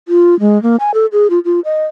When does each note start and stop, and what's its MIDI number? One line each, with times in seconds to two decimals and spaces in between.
0.08 0.38 65
0.40 0.61 56
0.63 0.76 58
0.80 0.91 80
0.94 1.06 69
1.12 1.30 68
1.30 1.39 65
1.45 1.60 65
1.65 1.84 75